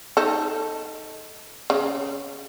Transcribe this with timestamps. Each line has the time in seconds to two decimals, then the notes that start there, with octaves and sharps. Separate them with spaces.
0.17 D#4 A4
1.70 C#3